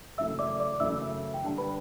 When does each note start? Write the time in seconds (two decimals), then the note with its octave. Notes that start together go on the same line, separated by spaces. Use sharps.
0.18 F#2 C#3 E3 A3 E5 E6
0.39 D5 D6
0.60 D5 D6
0.80 F#2 C#3 E3 A3 E5 E6
1.34 G5
1.42 D3 G3 D4 A5
1.58 B4 B5